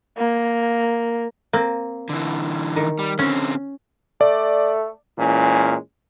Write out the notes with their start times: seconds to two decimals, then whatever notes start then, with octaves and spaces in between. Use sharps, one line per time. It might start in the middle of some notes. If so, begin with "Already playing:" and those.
0.17 A#3
1.53 A#3 C4
2.09 D3 E3
2.76 D#3
2.99 G3
3.19 D3 C4 C#4
4.21 A3 D5
5.19 A#2 E3 G#3 C#4